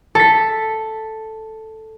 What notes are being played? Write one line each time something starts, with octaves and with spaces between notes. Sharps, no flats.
A4 B6